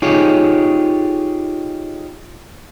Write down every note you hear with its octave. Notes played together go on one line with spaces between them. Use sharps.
D#4 F4 G4 G#4 C#5